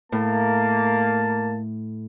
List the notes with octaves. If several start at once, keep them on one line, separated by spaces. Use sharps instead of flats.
A2 A#3 A5